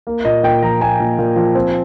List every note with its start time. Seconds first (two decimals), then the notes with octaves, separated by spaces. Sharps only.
0.07 A#3
0.25 A#2 D#5
0.43 A#2 G5
0.63 F3 A#5
0.81 A#3 G#5
1.00 A#2
1.19 A#2
1.36 F3
1.55 C4